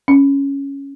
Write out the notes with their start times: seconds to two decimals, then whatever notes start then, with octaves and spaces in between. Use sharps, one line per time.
0.08 C#4